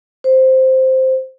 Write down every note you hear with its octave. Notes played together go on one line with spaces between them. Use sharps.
C5